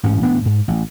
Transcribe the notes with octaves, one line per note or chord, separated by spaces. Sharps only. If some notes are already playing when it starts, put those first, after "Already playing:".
A1 G#2 C#4
D#1 A1 B3 D4
G#2
A1